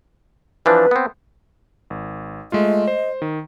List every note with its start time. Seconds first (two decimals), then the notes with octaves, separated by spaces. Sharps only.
0.66 E3 F3 D4 B4
0.91 B3 C4
1.90 G#1
2.52 G#3 A3 F4 D#5
2.88 C5
3.22 D#3